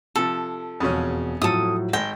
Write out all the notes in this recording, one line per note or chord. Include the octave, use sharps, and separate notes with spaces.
C3 F3 A4
E1 F2 C#3 C#4 F#4 D#6
A2 F3 F#3 A4 D#6
G#1 G5 A#6